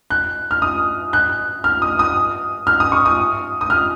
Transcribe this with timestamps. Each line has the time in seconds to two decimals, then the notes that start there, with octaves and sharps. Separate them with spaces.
0.10 F#6
0.51 F6
0.62 D#6
1.13 F#6
1.64 F6
1.82 D#6
1.99 D#6
2.67 F6
2.80 D#6
2.92 C#6
3.06 D#6
3.61 D#6
3.70 F6